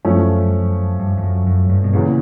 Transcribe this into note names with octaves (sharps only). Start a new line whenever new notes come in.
F#2 F3 A3 C#4
G2
F2
F#2
F#2
G2
B2
E2 A#2 C#3 E3